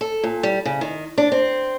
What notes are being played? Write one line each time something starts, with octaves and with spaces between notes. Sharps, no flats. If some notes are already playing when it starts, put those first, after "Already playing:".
A4
A#2
G3
C#3
D#3
D4
C4